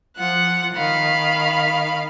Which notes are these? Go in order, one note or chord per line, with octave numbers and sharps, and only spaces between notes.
F3 F4 F#5 F#6
D#3 F5 B5